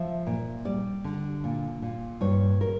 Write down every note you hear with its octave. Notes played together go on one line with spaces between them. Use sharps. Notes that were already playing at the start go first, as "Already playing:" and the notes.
Already playing: F3 E5
A#2
G3 D5
D3
A#2
A#2
G2 C#5
A#4